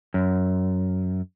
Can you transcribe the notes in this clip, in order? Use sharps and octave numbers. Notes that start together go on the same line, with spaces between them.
F#2